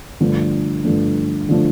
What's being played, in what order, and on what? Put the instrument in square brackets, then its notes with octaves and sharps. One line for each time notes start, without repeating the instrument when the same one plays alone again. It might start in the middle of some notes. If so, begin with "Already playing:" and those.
[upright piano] G2 D3 F3 A3 D4
G2 D3 F3 A3 D4
D3 F3 A3 D4